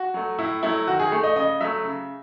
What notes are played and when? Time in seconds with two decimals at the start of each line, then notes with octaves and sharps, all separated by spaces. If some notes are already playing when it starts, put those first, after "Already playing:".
Already playing: F#4
0.14 F#3 A3
0.38 A2 E4
0.63 F#3 A3 E4
0.87 D#3 F#4
1.00 G#4
1.12 A3
1.23 D#5
1.36 C#3 D#5
1.61 F#3 A3 E5
1.85 C#3